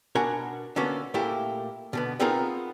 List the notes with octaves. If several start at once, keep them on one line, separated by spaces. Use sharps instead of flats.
B2 D4 F#4 A#4 F#5 G#5
D3 A#3 B3 C#4 F#4 A4
A#2 A3 A#3 E4 G4
B2 D3 B3
B3 C4 D#4 F4 G#4 A#4